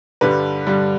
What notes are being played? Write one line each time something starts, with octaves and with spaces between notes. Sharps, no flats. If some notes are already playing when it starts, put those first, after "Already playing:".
G2 D3 G3 B4
G2 D3 G3